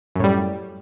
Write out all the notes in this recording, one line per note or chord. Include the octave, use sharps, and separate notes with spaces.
F#2 A2 G3